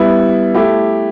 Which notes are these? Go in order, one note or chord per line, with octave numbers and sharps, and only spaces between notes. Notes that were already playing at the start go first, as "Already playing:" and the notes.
Already playing: G3 B3 E4
A3 E4 G4